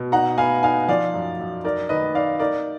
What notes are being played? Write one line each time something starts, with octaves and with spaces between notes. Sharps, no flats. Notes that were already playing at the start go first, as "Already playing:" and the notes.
Already playing: B2
D#4 F#5 A#5
B3 F5 G#5
D#4 F5 G#5
F3 D5 F5
F#2
F#2
D#4 A#4 D5
D#3 B4 D#5
D#4 D5 F5
D#4 A#4 D5